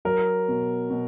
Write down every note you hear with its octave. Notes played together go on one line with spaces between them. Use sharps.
F#3 A#4
B2
B2